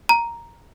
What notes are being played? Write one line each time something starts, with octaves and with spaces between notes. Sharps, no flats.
A#5